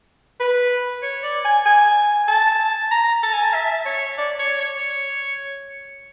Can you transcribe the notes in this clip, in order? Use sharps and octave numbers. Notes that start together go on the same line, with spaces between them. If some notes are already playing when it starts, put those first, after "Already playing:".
B4
C#5
D5
G#5
G#5
A5
A#5
A5
G#5
A5
E5
C#5
D5
C#5
C#5